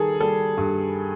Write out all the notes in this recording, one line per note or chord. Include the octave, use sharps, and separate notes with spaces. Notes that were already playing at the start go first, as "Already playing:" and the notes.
Already playing: D#3 G3 G#4 A4
G3 A4
G2